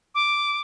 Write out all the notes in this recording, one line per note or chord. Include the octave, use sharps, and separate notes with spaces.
D6